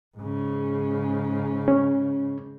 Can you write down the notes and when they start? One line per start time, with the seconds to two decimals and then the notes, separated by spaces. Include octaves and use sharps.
0.18 G#2 C#3
1.68 C#4